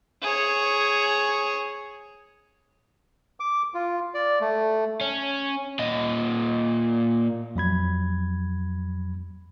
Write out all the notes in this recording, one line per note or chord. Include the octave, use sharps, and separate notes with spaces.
G#4 C#5
D6
F4
D5
A3
C#4
A#2 D#5
F2 F#3 B5 G#6